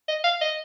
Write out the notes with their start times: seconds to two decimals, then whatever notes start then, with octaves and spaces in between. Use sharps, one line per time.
0.08 D#5
0.24 F5
0.41 D#5